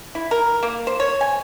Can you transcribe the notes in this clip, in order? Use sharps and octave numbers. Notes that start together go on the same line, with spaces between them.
E4
A#4
A#3
C5
C#5
G#5